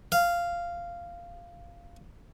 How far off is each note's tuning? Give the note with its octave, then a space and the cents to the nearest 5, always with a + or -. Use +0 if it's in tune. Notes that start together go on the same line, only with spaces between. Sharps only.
F5 -10